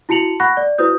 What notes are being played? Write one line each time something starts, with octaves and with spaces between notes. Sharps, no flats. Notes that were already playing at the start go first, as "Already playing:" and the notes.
E4 F#4 A5 C#7 F7 F#7
F#5 B5 C#6 F#6 A#6
D5
E4 F#4 B4 C5 D#6 G6